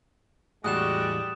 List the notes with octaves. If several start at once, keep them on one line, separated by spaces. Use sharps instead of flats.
E2 A2 G3 G#3 F#4 D#6 F#6 E7